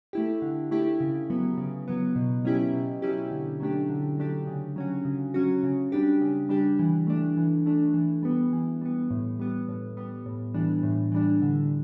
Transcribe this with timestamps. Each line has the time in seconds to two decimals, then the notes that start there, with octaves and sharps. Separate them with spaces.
0.13 A3 E4 G4
0.42 D3
0.71 A3 E4 G4
1.00 C#3
1.30 F#3 B3
1.58 C#3
1.88 F#3 B3
2.16 B2
2.45 F#3 C#4 E4 G4
2.73 B2
3.02 F#3 C#4 E4 G4
3.31 D3
3.60 F#3 A3 D4 G4
3.90 D3
4.18 F#3 A3 D4 G4
4.47 C#3
4.76 F#3 C#4 F#4
5.05 C#3
5.34 F#3 C#4 F#4
5.63 C#3
5.92 G3 D4 G4
6.21 C#3
6.49 G3 D4 G4
6.79 E3
7.07 A3 D4
7.37 E3
7.66 A3 D4
7.94 E3
8.23 G3 B3
8.53 E3
8.81 G3 B3
9.11 A2
9.39 G3 B3
9.69 A2
9.97 G3 B3
10.26 A2
10.54 E3 G3 D4
10.83 A2
11.12 E3 G3 D4
11.42 D3